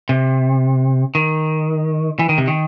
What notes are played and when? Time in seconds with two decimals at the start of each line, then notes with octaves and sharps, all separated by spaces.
0.09 C3
1.15 D#3
2.19 E3
2.29 D#3
2.38 C3
2.48 D#3